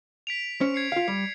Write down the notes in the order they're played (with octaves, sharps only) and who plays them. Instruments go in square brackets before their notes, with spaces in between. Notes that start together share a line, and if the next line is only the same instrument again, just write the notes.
[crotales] B6 D7 F7
[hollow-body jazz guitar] C#4 C5
[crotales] G#6 C7 C#7
[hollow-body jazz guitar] F4 F5
G3